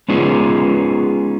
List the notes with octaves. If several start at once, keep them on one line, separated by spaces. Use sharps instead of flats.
G#3 B3 C#4 D#4 F4 G#4